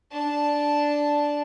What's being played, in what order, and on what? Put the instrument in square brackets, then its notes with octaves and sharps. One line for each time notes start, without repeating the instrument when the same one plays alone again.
[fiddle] D4 A5